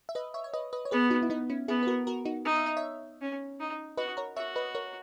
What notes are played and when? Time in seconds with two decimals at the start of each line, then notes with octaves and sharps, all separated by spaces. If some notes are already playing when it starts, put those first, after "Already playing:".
0.09 E5
0.15 B4 D#5
0.34 C#5 E5
0.44 C#5
0.54 B4 D#5
0.73 B4 D#5
0.85 C#5
0.91 B3 G#4 B4
1.10 D#4 F#4
1.22 E4
1.30 B3 D#4
1.50 C#4 E4
1.68 B3 E4 G#4
1.83 B4
1.87 F#4 A#4
2.07 F#4 A#4
2.25 D#4 F#4
2.45 D#4
2.56 E5
2.66 D#5
2.77 C#5 E5
3.21 C#4
3.60 D#4
3.97 F#4 B4 D#5
4.17 A#4 C#5
4.36 F#4 C#5 E5
4.56 B4 D#5
4.75 A#4 C#5